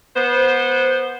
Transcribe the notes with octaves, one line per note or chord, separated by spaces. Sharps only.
B3 C5